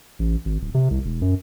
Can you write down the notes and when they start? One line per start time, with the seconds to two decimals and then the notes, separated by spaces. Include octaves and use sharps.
0.19 A1
0.45 G#1
0.61 D1
0.74 C3
0.91 C2
1.04 E1
1.22 F#2